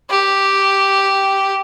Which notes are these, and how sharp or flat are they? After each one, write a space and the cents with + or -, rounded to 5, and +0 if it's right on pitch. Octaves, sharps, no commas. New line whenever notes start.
G4 -5